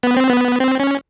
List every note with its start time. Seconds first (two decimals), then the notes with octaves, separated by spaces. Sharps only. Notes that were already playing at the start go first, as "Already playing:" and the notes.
0.03 B3
0.16 C4
0.30 B3
0.60 C4
0.80 C#4